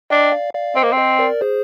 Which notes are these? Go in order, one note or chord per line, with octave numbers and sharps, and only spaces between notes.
D4 D#5 G5
D5 F5
D5 F5
C4 C5 D#5
A#3
C4
C5 D#5
A#4 D5
G#4 C5